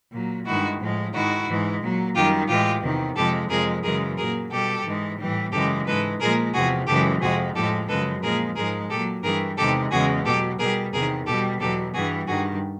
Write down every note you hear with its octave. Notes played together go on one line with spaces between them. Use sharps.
A#2 F#3
G2 D#3 G#3 E4 F#4
A2 F3 G#3
G#2 D#3 G#3 E4 F#4
G#2 E3 G#3
A#2 F#3
F#2 D#3 G3 F4 G4
A2 E3 G#3 F4 G4
E2 C3 D#3
F2 C3 F3 G#3 G4 A4
F2 C3 F3 G#3 G#4 A#4
F#2 C#3 E3 G#3 G#4 A#4
A#2 F#3 G#4 A#4
B2 G3 G4 A4
G#2 E3 G#3
A2 E3 G3
F#2 C#3 E3 G#3 G4 A4
G#2 E3 G#3 A4 B4
A#2 F3 G#3 G#4 A#4
E2 C3 F3 F#4 G#4
F#2 C#3 E3 G#3 G4 A4
F2 C3 F3 G#3 F#4 G#4
A2 F3 G#3 G4 A4
F#2 C#3 F3 G#3 A4 B4
A#2 F3 G#3 G#4 A#4
G#2 F3 G#3 G#4 A#4
A#2 F#3 G4 A4
G2 E3 G3 G#4 A#4
E2 C3 D#3 G#3 G4 A4
E2 C#3 E3 G#3 F#4 G#4
B2 F#3 G4 A4
B2 G3 G#4 A#4
E2 C3 D#3 G#4 A#4
B2 G3 G4 A4
E2 B2 F#3 G4 A4
G2 E3 G3 F#4 G#4
G2 D#3 G3 F#4 G#4